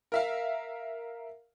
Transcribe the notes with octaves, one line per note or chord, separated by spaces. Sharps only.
A#4 E5 F5